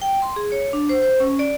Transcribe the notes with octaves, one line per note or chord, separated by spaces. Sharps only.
G5
C6
G#4
C#5
D4
C5
C5
C#4
D5